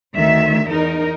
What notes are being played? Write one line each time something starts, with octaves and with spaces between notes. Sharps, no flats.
D2 D#3 E5
E2 D#4 A#4